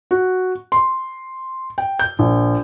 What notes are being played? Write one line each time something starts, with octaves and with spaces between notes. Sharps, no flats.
F#4
C6
G5
G6
A#1